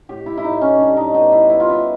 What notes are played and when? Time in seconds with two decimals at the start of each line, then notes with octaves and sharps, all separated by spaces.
0.09 A2 G4
0.26 E4
0.38 E4
0.44 A2 D#4
0.61 C#4
0.79 G3 D4
0.97 D#4
1.14 B3 D#4
1.32 E4
1.49 D#3 E4
1.60 F4
1.69 E4